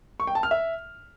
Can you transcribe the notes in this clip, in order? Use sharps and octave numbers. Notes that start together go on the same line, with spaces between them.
C#6
G5
A5
F6
E5